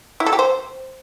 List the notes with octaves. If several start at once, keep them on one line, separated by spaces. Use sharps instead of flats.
E4
A4
G4
C5